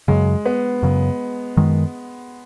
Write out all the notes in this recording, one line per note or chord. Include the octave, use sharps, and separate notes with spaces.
F#2 C#3 F#3 G#3
B3
F#2 C#3 F#3
F#2 D#3 G#3